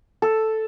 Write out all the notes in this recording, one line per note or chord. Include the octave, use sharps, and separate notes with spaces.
A4